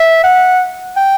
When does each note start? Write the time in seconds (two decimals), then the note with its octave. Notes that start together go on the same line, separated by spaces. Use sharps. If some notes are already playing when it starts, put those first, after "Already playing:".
Already playing: E5
0.24 F#5
0.96 G5